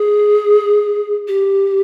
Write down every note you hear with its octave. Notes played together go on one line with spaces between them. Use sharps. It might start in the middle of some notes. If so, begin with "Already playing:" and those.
Already playing: G#4
G4